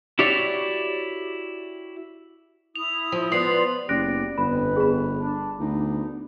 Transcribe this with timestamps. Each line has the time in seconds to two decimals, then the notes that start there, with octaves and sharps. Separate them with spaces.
0.19 E4 F#4 G4 C#5 D5 E5
2.76 E4 D#6 F7
3.12 F3
3.32 F3 B3 B4 D5 C6 D#6 C7
3.89 F#1 B3 G4 D5 F#6 A#6 D7
4.38 G1 F2 B3 B4 B5
4.77 G#4 B5
5.20 D4
5.59 D2 B3 D4 D#4